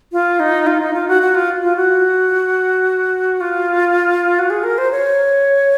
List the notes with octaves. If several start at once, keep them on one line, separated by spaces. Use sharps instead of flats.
F4
D#4
F4
D#4
F4
F#4
F#4
F4
F4
F#4
F4
F#4
G#4
A#4
C5
C#5